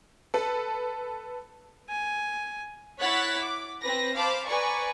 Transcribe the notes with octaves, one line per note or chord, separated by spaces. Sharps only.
A4 B4
G#5
E4 C#5 F#5 F#6 A6 B6
D6
C4 B4 A#6
C5 F5 A5 B5 D6
B4 D5 G#5 A#5 C#6